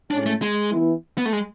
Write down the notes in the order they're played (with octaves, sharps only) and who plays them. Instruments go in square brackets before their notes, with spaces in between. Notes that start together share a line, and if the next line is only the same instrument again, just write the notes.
[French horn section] A2 G#3 C#4 [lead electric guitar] D4
[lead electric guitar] A3
G#3
[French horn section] E3 B3 E4
[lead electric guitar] B3
A3
G#3